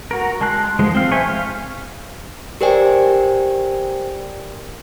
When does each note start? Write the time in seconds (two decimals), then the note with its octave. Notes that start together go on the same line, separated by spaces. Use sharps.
0.11 F#4 A#4
0.41 G#3 A5 C6 F#6
0.79 F3 G#3
0.94 C4 F5
1.12 C5 E5 G#5 C#6
1.28 F5
2.61 G4 A#4 C5 D5 G5 G#5